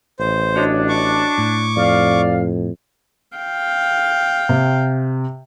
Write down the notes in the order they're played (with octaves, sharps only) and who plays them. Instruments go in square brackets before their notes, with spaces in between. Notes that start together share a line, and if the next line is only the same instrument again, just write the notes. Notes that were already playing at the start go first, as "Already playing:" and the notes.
[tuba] A1 [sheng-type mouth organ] C5
[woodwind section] D4 [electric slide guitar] F#4 C#5 D#5
[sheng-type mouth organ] C#6 D6
[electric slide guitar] A2
[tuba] F2 [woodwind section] D5 F5
[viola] F5 G5
[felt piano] C3